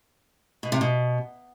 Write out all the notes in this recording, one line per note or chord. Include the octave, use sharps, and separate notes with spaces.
B2
C3
B2